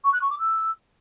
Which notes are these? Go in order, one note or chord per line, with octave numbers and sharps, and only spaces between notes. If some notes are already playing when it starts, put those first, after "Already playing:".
C#6
F#6
C#6
D6
E6